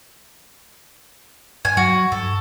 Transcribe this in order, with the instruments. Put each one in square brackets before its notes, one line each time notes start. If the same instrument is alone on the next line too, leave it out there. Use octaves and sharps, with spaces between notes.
[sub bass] G2 [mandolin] G#5
[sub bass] F#3 [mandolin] F#4
[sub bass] G2 [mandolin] A4